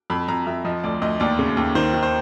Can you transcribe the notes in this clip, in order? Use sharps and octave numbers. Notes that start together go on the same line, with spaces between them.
F2 B5
F2 A#5
F2 E5
F3 D#5
D2 D5
D2 D#5
D#2 D5
C#3
D#2
D#3 C5
D#3
C5